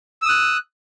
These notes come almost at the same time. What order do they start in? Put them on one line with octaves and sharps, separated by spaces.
E6 D#6 F#6